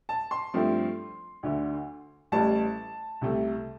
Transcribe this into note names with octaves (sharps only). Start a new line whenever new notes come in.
A5
C6
G2 F3 A3 C4
D2 D3 A3
A1 A2 G3 A5
C2 C3 A3